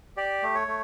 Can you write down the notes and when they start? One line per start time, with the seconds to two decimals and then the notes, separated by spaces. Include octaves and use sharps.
0.17 G4 D5
0.43 A3
0.55 C#5
0.67 A3